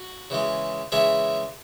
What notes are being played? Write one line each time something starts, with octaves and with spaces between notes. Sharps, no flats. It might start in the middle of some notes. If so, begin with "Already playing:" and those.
Already playing: F#4
C#3 E3 G#3
C#3 E3 G#3 C#5 E5